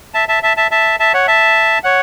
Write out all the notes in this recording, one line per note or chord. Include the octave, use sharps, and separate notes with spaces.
E5 A5
E5 A5
E5 A5
E5 A5
E5 A5
E5 A5
C#5 F#5
E5 A5
C#5 F#5